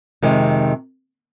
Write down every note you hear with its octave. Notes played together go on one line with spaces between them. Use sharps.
F2 C3 D#3 G#3